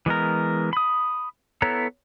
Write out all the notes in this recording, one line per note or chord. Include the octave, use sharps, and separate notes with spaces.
E3 G#3 B3 A#4
B5 D#6
B3 E4 A4 C#5 A#5